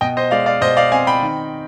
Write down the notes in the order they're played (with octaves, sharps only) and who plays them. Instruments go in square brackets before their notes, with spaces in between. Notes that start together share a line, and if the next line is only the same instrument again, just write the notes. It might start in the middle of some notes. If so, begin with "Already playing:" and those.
[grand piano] B2 D#5 G5
C5 D#5
G#3 D5 F5
D5 F5
B2 C5 D#5
D5 F5
C4 F5 G#5
G5 B5
D#3